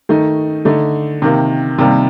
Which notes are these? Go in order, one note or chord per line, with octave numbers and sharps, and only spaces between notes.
D#3 A3 D#4
D3 A3 D#4
C3 D#3 A#3
C3 D#3 G3 A#3